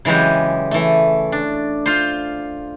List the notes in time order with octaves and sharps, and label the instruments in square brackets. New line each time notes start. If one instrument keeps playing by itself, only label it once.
[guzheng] C#3 E3 F#3 G#3 G4
E3 A3
D4
F4 C5